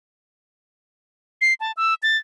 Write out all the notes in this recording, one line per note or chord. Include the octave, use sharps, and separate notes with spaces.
C7
A5
E6
A6